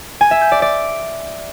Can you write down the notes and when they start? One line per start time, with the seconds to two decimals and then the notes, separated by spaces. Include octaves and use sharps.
0.21 G#5
0.31 E5
0.41 G6
0.52 D5
0.62 D5